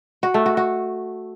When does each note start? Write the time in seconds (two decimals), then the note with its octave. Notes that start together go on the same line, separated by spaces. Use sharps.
0.23 F#4
0.34 A3
0.46 F#4
0.57 F#4